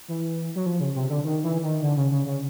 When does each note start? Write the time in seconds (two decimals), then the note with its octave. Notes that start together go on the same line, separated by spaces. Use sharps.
0.08 E3
0.56 F#3
0.66 F3
0.80 C#3
0.95 C3
1.10 D3
1.25 D#3
1.44 E3
1.63 D#3
1.82 D3
1.97 C#3
2.11 C#3
2.26 C#3